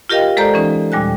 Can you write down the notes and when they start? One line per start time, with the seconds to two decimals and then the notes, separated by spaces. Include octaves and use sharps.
0.09 F4 G4 A#4 D#5 F5 G5
0.37 G#3 A4 C5 D5 A#5 G6
0.54 E3 C#4 D#4
0.92 D#2 A#2 G3 G#5 F#6